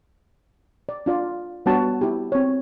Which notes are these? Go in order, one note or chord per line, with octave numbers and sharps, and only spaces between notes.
D5
D4 F4 D5
G3 B3 D4 F#4 C#5 A5
B3
E4 G4
C4 C#5